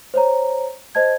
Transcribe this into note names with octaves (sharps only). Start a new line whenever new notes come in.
C5 C#5 A#5
C5 D#5 A5 G#6